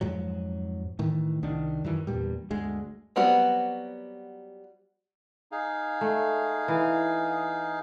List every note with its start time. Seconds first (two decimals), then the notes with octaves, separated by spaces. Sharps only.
0.01 F2 G#2 F#3
0.99 A2 D#3 E3
1.43 C2 D#3 D4
1.84 F#2 D#3 E3
2.07 E2 G2 A#2 G3
2.50 G1 D2 G#3
3.16 F#3 G3 B3 C4 F#4
5.52 D#4 G#4 F5
6.01 A3
6.68 E3